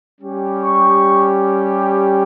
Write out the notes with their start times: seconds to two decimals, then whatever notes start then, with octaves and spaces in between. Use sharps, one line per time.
0.20 G3 C#4 G4
0.62 C#6